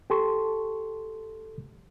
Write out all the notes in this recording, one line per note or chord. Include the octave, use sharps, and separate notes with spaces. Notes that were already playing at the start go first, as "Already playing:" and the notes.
G4 A4 A5 C6 C#6